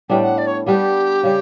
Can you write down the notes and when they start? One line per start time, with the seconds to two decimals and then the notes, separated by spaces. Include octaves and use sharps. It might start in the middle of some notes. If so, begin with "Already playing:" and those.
0.10 A2 G3 B3 D4 G5
0.24 F#5
0.38 D5
0.47 C#5
0.66 G3 B3 D4 G4
1.23 C#3 G3